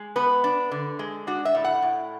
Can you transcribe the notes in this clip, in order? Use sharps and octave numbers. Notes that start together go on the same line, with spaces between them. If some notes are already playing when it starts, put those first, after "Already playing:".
Already playing: G#3
B3 B4
D4
D3
G#3
D4 F#4
E5
A2
F#5
A2